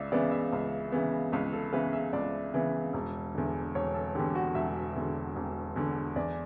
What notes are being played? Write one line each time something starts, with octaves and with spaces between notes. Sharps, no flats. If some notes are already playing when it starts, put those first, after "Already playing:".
Already playing: C#2 D5 E5
C#3 E3 B3 D5
E5
C#2
C#3 E3 B3
C#2 B4
A4
C#3 E3 B3 B4
E5
C#2 D5
C#3 E3 B3
E1
E2 D3
E1 C#5
A4
E2 D3 G4
F#4
E1 E5
E2 D3
E1
E2 D3
E2 D5